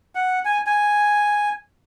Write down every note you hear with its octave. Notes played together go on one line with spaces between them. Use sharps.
F#5
G#5
G#5